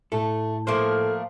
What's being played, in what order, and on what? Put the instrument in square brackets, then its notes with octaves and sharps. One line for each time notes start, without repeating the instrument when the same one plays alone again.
[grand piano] A2 [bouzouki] A3 [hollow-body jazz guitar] A4
[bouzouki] F3 A3 A#3 [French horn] A4 [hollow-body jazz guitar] C5